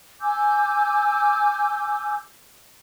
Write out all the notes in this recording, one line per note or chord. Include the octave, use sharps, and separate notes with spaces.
G#5 D6 E6 G6